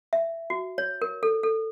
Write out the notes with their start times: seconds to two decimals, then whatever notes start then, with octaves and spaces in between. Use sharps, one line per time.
0.13 E5
0.50 F#4
0.78 C#5
1.02 A#4
1.23 A4
1.43 A4